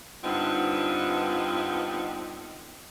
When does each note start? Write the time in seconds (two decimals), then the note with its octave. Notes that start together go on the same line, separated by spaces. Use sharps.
0.24 G2 D3 B3 C4 D#4 F4